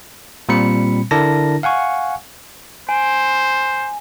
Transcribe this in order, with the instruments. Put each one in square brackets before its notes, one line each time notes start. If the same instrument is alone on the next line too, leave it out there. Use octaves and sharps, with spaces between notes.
[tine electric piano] A#2 G3 C4 B5 C#7
D3 D4 E4 A#4 A5 A#6
F5 F#5 G#5 C#6
[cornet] C5 [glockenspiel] G#5